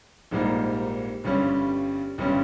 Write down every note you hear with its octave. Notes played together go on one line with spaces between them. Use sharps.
A#1 G#2 G3 A#3 D#4
G1 G2 G3 C#4
G1 G2 G3 C#4